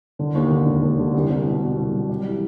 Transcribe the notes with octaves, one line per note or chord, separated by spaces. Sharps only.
D3
D#2
D3
E1
D#2
D3
C2
C2
B2
B2
C2
F#3
G3
E3